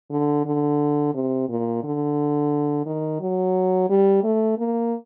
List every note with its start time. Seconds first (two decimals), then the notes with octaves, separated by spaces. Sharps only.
0.11 D3
0.45 D3
1.15 C3
1.49 A#2
1.84 D3
2.86 D#3
3.21 F#3
3.90 G3
4.24 A3
4.58 A#3